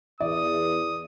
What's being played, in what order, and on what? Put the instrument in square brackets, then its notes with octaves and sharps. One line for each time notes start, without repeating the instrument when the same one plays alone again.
[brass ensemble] E2 [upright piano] D5 [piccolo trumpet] D#6